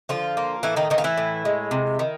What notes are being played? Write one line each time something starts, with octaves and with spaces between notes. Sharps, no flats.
D3 F3 F4
A#3
A2 E3 E4
D#3 D#4
D#3 E3 D#4
F4
E3 E4
A2
G#3
C3
D#3